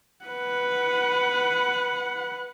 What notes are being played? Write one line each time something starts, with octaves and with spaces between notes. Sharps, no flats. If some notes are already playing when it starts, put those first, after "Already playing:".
B4 F#5